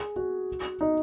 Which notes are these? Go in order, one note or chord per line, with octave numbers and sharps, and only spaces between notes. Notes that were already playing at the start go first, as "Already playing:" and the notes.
Already playing: G#4
F#4
D#4